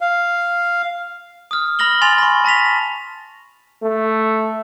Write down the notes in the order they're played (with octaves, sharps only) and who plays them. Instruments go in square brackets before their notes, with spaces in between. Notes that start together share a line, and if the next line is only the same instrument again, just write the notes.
[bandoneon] F5
[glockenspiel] D#6 F6
B5 F6 A#6 F#7 G7
G#5 C6 A6 F7
B5 C#6
A5 A#6 B6 F7
[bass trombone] A3